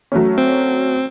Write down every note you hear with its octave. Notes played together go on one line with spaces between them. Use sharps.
F#3 A3 C#4
C4